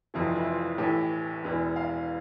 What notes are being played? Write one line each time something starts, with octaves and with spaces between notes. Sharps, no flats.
F1 F2 C3 E3 E4
F4
E4
F4
A1 A2 E3 G4
E1 E2 E3
F5